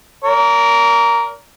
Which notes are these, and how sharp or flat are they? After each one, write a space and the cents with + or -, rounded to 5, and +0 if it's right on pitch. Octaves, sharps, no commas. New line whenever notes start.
A#4 +0 D5 -40